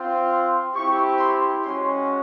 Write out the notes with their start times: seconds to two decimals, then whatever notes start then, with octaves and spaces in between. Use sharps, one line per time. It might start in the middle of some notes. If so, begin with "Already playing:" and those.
Already playing: C4 F4
0.30 C6
0.75 C4 E4 G4 C#6
1.20 C6
1.65 G#3 C#4 F#4 C6